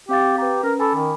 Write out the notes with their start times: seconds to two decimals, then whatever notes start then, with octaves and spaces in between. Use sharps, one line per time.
0.09 C4 G4 F5 A6
0.38 G4 B4 A#5
0.63 C#4 A#4
0.79 A4 G#5 B5 D6
0.96 D#3